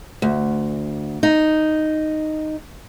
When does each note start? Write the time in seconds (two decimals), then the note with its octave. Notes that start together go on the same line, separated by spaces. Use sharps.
0.22 D2
1.23 D#4